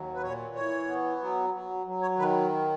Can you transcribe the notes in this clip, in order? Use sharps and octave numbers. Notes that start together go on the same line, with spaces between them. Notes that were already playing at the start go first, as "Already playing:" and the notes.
Already playing: D#2 F#3
B4
A#2 C#5
E3 C#5
B3
F#3
F#3
F#3
C#5
D#3 B4